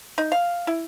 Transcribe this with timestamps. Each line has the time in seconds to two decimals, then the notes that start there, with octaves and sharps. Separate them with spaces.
0.18 D#4
0.32 F5
0.67 E4